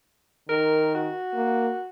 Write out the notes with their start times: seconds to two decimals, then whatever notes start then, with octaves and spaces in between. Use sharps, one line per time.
0.49 D#3 A#4
0.95 F#4
1.34 A#3